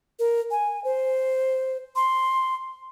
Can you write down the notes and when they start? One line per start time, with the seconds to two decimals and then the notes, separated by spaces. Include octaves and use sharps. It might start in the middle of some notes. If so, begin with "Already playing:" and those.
0.19 A#4
0.51 G#5
0.84 C5
1.96 C6